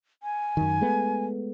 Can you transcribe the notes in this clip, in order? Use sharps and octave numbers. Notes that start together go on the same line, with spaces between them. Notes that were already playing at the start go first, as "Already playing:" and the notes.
G#5
F#2 D#3
G#3 A3 B3